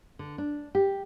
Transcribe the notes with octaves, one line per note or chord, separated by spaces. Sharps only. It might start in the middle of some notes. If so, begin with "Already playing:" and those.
D3
D4
G4